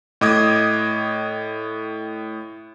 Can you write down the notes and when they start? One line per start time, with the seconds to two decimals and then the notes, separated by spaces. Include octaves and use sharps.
0.21 A2 D#5 D6 D#6 G#6